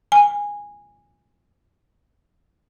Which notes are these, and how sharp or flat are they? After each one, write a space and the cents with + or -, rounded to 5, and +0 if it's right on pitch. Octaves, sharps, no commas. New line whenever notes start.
G#5 -15